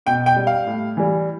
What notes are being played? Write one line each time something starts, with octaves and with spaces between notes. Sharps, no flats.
B2 G5
G5
G3
F5
A2
E3 G3